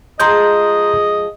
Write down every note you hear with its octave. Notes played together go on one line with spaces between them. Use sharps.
F3 G#3 G#4 D#5 A#5 C6 G6